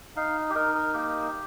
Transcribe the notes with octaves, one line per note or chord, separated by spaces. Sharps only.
D#4 F5
G4
D#4 A#4
A#4
A#3 G4